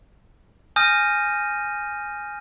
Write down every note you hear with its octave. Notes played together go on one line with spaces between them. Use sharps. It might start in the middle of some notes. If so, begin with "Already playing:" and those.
G#5 D#6 F6 G6 A#6 D#7